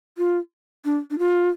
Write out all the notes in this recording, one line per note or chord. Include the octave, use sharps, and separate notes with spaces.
F4
D4
D4
F4